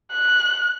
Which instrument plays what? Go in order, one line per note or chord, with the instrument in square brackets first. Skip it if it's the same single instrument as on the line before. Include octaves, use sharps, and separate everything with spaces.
[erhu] F#6